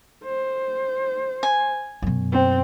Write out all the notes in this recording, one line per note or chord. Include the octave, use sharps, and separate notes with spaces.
C5
G#5
F#2 B2
C4